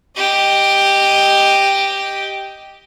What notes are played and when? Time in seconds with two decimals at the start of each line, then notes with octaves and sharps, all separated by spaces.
0.17 G4 D#5